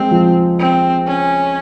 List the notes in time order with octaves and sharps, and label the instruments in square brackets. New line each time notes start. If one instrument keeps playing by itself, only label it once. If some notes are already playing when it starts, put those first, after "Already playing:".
Already playing: [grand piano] G#3 [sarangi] C4
[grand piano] F3
[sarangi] C4
C#4